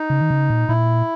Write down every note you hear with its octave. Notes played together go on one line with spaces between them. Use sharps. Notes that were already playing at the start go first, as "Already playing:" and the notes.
Already playing: D#4
C#3
D#3
C#3
A#2
A#2 E4